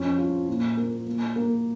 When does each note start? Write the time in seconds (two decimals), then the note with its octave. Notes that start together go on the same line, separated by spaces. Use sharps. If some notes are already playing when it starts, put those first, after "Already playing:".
Already playing: F2 C#4
0.18 F4
0.49 A#2
0.77 A#3
1.07 A#3
1.36 A#3